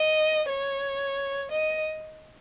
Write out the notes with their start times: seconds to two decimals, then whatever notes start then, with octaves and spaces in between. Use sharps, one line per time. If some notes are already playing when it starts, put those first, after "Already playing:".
Already playing: D#5
0.50 C#5
1.52 D#5